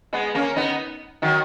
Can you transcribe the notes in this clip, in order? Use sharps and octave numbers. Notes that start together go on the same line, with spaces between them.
G#3 B3
A#3 C#4
B3 D#4
D#3 F#3